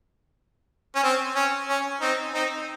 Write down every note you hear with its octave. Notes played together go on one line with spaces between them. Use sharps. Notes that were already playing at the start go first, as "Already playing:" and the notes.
C#4
C4
C#4
C#4
C4 D#4
C4 D#4